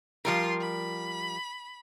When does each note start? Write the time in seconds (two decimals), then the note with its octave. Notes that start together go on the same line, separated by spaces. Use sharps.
0.25 F3 G3 F4 A#4 C6
0.61 B5